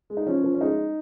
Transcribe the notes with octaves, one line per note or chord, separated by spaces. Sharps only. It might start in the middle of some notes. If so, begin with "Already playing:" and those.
G#3
D#4
F3 C#4
F3
C#4
G#3 D#4